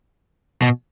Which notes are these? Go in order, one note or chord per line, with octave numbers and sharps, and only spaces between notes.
B2